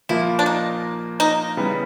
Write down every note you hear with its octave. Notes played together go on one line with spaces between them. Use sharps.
A#2 F3 A#3 E4
D4
D#4
D#4
C#3 E3 G3 B3